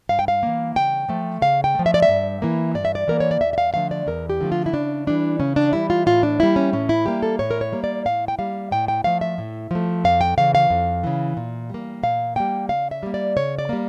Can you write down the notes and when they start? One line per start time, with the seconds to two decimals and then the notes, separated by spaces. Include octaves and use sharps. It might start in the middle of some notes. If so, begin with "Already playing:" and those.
0.09 G2 F5
0.19 G5
0.28 F5
0.43 E3 A#3
0.76 C#3 G5
1.09 F3 A3
1.42 C#3 F5
1.64 G5
1.75 F3 A3
1.86 E5
1.94 D5
2.02 E5
2.09 G2
2.42 E3 A#3
2.75 G2 D5
2.85 E5
2.95 D5
3.08 E3 A#3 A#4
3.20 C#5
3.31 D5
3.41 E2 E5
3.53 E5
3.58 F5
3.74 D3 F3 A3 F5
3.91 D5
4.07 E2 A#4
4.29 G4
4.41 D3 F3 A3
4.52 F4
4.66 E4
4.73 C#3 D4
5.07 E3 G3 D4
5.40 C#3 C#4
5.56 D4
5.73 E3 G3 E4
5.90 F4
6.06 A2 F4
6.23 D4
6.40 G3 A#3 E4
6.56 C#4
6.73 A2 C#4
6.89 E4
7.06 G3 A#3 G4
7.23 A4
7.39 A2 C#5
7.51 A#4
7.61 C#5
7.72 G3 A#3
7.84 D5
8.05 A2 F5
8.28 G5
8.38 G3 A#3 F5
8.71 A2 G5
8.88 G5
9.04 F3 A3 F5
9.21 E5
9.38 A2
9.71 F3 A3
10.04 F2 F5
10.21 G5
10.38 C#3 E3 F5
10.55 F5
10.70 F2
11.03 C#3 E3
11.37 A#2
11.70 G3 A#3
12.03 A#2 F5
12.36 G3 A#3 G5
12.69 C#3 F5
12.91 E5
13.03 G3 A#3
13.14 D5
13.37 C#3 C#5
13.59 D5
13.69 G3 A#3